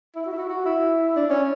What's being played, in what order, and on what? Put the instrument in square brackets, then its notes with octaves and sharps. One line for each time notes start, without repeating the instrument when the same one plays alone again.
[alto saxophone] E4
F#4
E4
F#4
F#4
E4
D4
C#4